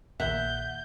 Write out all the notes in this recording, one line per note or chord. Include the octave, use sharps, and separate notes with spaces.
A#1 D#2 A#2 E5 F#5 G6